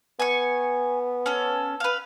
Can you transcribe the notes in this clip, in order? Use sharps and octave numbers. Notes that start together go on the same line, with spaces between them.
B3 G#5 C#6
C#4 A4
B4 F5